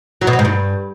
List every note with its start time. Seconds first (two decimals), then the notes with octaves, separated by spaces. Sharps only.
0.21 F#3
0.27 B2
0.33 F#3
0.39 G#2
0.45 G2